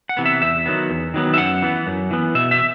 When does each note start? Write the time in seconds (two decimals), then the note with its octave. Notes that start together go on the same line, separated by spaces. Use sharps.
0.09 F#5
0.17 C3 E3 B3
0.25 E5
0.42 E2 E5
0.66 D#3 F#3 B3
0.89 E2
1.14 D#3 F#3 B3
1.34 E5
1.38 F#2 F#5
1.62 E3 B3
1.87 F#2
2.11 E3 B3
2.35 B2 E5
2.51 E5